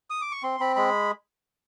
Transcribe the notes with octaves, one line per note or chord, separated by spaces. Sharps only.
D#6
D6
C#6
C4 C6
C4 B5
G#3 B5